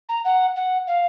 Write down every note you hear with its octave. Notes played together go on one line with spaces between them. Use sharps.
A#5
F#5
F#5
F5